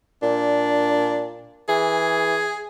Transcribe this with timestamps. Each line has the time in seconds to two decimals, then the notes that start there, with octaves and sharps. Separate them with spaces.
0.23 A#2 D4
1.69 E3 G#4